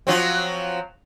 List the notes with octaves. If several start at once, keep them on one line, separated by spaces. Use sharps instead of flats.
F3 F#3 C4